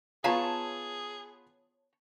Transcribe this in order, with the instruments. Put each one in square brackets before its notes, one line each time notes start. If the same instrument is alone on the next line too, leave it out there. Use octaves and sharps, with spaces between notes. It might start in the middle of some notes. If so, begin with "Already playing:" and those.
[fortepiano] B3 F4 [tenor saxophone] G#4 [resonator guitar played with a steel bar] C#5 A5 [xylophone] F5 A#5 C7